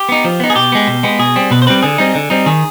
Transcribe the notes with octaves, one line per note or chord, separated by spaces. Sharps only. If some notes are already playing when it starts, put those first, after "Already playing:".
Already playing: G4
B3 D#4
F3
B3 D#4
G#4
B2 G4
G#3 B3
B2
G#3 B3
B2 G#4
G3 C4
B2 B4
C5
G3 C4 B4
D3 G#4
G3 C4 D#4
D3
G3 C4 D#4
D#3 G#4